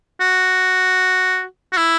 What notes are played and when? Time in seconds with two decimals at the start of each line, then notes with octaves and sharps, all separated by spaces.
0.21 F#4
1.72 F#4
1.77 E4